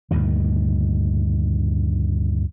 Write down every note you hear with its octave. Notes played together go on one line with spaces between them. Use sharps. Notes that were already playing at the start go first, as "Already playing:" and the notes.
D2 G2 A#2 D#3